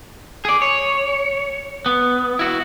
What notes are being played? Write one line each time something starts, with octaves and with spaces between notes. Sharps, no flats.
G#4 D5
C#5
B3
E4 F#4